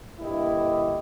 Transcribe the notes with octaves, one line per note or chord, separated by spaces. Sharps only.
G2 A#2 D3 E4 G4 D#5